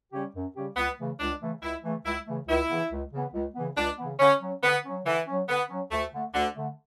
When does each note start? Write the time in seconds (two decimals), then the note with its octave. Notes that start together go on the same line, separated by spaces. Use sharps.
0.13 C#3 G3 C#4 G4
0.35 F#2
0.56 C#3 G3 C#4 G4
0.77 C#2 B3
0.99 C#3 E3 A3
1.20 C#2 D4
1.41 C#3 E3 A3
1.63 C#2 E4
1.84 C#3 E3 A3
2.06 C#2 E4
2.27 C#3 E3 A3
2.48 C#2 E4
2.70 C#3 E3 B3
2.91 C#2
3.13 C#3 E3 B3
3.34 C#2
3.56 C#3 E3 B3
3.77 C#2 D4
3.99 C#3 E3 B3
4.20 D3 C#4
4.41 F#3 C#4
4.63 D3 B3
4.85 F#3 C#4
5.06 D3 E3
5.27 F#3 C#4
5.49 D3 B3
5.70 F#3 C#4
5.92 D2 A3
6.12 D3 A3
6.35 D2 D3
6.56 D3 A3